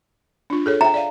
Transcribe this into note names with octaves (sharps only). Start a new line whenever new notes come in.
D4 F4
G#4 A4 C#5
E5 G5 A#5
D5 E5 F5